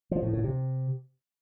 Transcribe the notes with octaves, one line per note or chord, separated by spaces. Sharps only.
F3
A2
A2
C3